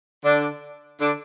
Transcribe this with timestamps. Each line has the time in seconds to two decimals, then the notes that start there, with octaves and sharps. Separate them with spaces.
0.24 D3 D4
1.00 D3 D4